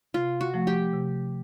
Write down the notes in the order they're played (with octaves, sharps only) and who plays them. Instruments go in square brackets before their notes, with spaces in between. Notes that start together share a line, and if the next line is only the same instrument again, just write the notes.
[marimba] C3 [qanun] F4
[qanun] F#4
[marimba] F3 A3
[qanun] G4
[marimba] C3